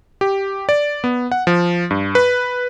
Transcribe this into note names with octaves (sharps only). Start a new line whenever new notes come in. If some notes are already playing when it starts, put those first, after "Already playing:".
G4
D5
B3
F#5
F3
G2
B4